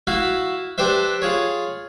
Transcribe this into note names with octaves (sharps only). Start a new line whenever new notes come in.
E4 F#4 E5 F5
D4 G4 B4 C5 E5
F4 G#4 C#5